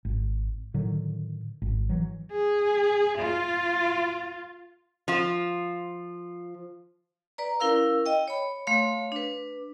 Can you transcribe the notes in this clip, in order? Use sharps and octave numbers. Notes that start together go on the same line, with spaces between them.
G#1
A2 D3 D#3 F#3
G#1
E3 F#3
G#4
F4
F3 F4
B4 D5 A#5
C#4 E4 A#4 F5 E6
D#5 G5
C#5 B5
A3 C#5 F5 C6
D4 B4